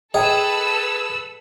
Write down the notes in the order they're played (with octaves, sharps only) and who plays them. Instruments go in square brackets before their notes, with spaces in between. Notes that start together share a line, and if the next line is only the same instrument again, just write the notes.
[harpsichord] G#4 [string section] A4 B4 E6 [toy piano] D#5 G5